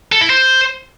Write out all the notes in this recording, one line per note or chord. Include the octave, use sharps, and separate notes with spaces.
A4
E4
C5